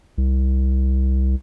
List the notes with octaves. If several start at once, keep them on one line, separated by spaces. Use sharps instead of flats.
C2